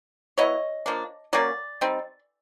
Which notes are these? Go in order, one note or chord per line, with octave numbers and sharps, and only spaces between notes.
F#3 B3 E4 C#5 D#5
F3 A#3 D4
F#3 A#3 C#4 D5
G3 C4 D#4